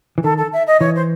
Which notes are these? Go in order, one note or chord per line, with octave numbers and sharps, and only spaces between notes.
E3
D#3 A4
A4
E5
D#5
E3 C#5
C5